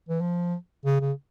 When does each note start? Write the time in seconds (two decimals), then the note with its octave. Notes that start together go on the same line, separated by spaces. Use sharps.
0.09 E3
0.21 F3
0.85 C#3
1.01 C#3